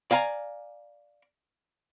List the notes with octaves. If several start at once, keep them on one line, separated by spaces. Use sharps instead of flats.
D5 F5 G#5 A#5